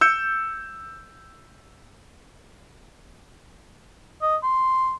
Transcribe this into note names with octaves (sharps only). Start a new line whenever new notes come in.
E6 G6 C#7
D#5
C6